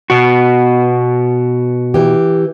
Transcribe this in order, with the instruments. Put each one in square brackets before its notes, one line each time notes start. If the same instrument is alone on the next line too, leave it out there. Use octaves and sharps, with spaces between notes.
[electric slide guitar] B2 F#4
[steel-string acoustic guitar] E3 G4